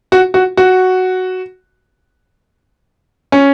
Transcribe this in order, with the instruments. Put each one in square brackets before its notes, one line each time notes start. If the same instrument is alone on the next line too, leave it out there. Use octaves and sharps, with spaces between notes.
[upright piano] F#4
F#4
F#4
C#4